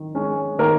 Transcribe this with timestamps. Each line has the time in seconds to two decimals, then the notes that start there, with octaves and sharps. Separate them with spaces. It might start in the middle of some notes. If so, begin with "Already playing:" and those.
Already playing: D#3
0.15 G#3 C#4
0.58 D#3 A#3 A#4